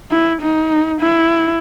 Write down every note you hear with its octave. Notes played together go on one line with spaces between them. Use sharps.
E4
D#4
E4